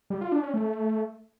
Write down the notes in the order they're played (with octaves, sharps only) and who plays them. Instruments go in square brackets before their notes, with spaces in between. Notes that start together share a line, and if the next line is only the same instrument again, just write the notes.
[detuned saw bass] G3
F4
D4
C#4
A3